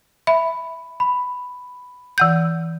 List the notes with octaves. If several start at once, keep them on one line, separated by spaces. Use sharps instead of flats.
E5 B5
B5
E3 F#5 G6